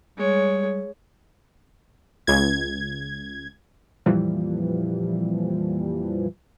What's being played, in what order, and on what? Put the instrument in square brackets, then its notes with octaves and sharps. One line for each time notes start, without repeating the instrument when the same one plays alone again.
[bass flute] G3 [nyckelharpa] G#3 C#5
[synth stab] C#2 G#6
[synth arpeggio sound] F2 A#2 E3 F3 G3